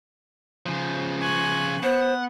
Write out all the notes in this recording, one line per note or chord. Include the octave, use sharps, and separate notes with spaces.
C#3 F3
G#5 C#6 F#6
B3 C5 F#5